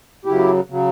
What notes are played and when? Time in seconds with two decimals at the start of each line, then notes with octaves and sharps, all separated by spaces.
0.25 F#2 C#3 F#3 E4 G4
0.70 C#3 F#3